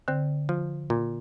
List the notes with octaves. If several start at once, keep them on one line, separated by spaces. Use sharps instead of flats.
D3 C4
F3
A#2